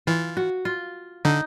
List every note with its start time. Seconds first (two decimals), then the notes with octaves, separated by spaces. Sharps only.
0.07 E3 F4
0.37 F#4
0.65 F4
1.25 D3 D#4